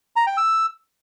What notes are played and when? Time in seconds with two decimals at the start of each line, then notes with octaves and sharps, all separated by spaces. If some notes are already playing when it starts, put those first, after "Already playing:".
0.16 A#5
0.27 G5
0.37 E6